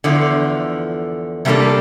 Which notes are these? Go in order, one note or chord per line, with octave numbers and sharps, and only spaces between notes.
E2 D3 F3
C3 G3 A#3 D4 A4